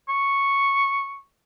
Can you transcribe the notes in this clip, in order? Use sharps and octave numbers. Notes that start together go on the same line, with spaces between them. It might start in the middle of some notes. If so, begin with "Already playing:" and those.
C#6